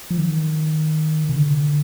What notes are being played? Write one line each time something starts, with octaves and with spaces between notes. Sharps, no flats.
F3
D#3
C3
D3